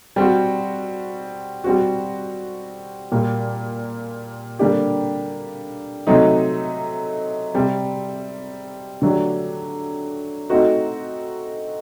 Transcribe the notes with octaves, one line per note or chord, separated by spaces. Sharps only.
G3 C4 F#4
G3 C4 F#4
A#2 G3 A#3
D3 G3 A#3 D4 G4
C3 F#3 A3 C4 D#4
C3 G3 C4
D3 F#3 A3 D4 G4
A3 C4 D#4 F#4